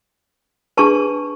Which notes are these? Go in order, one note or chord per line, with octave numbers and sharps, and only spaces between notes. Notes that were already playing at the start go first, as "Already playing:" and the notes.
D4 G#4 B4 A5 C#6